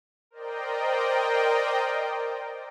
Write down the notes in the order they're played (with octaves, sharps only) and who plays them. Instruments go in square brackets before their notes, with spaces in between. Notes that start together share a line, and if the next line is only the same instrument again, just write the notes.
[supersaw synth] A#4 C5 D5 D#5 G5